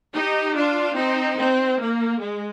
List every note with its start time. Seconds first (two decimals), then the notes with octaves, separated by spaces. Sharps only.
0.15 D#4 G4
0.55 D4 F4
0.97 C4 D#4
1.38 C4
1.79 A#3
2.20 G#3